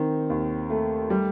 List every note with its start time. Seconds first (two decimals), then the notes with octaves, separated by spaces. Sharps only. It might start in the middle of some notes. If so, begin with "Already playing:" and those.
Already playing: D#3 C4
0.30 D#2
0.70 A3
1.10 G3